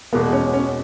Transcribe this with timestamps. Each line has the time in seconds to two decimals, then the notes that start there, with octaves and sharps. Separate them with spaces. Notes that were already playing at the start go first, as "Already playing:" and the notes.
0.13 E2 B2 G#3 A#3 B3
0.33 C#4
0.54 C#4